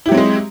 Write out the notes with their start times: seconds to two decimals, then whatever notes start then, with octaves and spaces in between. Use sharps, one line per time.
0.06 E4
0.09 G4
0.12 F#3
0.14 C4
0.17 G#3